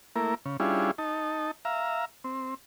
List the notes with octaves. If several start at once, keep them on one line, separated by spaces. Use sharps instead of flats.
A3 A#3 E4 A#4
C#3
G3 C#4 D4 E4 F4 G#4
D#4 A5
E5 F5 A#5
C4